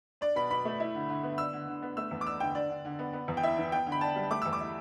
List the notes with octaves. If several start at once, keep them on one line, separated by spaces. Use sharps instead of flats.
D4 D5
B2 B5
B2 B5
A3
E4
D3
D3
B3
D4 E6
D3
D3
B3
A3 E6
E2
D6
D4 E6
D3 G5
D4 D5
D3
D3
B3
B3
E2
G5
E4 E5
E3
B3 G5
D3
B5
D4 A5
G3
A3 D6
E2 E6
D6
E4